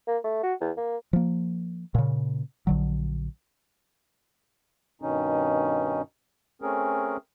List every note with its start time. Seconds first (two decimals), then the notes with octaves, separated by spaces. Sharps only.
0.07 A#3
0.24 A3
0.43 F#4
0.61 E2
0.77 A#3
1.13 F3 A#3
1.95 A#2 C#3
2.67 A#1 D3 F#3
5.02 G2 B2 D#3 C#4 D#4
6.62 A3 C4 C#4 G#4 A#4